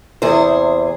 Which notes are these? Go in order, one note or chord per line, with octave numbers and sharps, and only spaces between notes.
E2 C3 G#4 C5